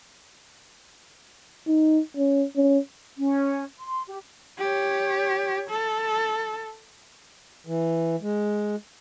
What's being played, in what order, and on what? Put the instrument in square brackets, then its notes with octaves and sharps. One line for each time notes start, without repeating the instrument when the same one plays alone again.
[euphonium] D#4
C#4
C#4
[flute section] C#4
C6
G4
[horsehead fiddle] G4 C#5
A4
[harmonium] E3
G#3